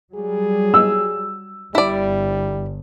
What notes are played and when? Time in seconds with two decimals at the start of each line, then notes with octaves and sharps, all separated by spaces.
0.15 F#3 G3 G#4
0.74 E6
1.75 G1 G3 E4 D5